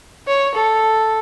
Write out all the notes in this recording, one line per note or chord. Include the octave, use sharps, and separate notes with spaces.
C#5
A4